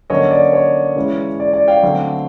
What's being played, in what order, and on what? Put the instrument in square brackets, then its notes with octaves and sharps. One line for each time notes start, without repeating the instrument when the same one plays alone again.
[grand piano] D3 F#3 A#3 C#4 C#5 D#5
D5
C#5
C#3 E3 G#3 C#4
D5
D5
F5 G5
D3 F#3 A3 C4